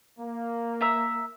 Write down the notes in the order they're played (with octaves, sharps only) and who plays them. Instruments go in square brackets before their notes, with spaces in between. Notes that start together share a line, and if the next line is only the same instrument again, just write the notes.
[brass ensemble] A#3
[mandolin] E5 A#5 E6